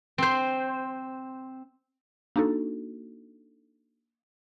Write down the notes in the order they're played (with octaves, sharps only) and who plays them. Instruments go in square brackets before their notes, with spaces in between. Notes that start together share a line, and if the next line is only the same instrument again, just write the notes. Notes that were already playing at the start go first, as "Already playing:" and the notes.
[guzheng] C4 C5
[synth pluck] A#3 D4 D#4 F#4 A4